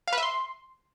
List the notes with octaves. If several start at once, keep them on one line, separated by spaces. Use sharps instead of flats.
F5
B4
E5
C6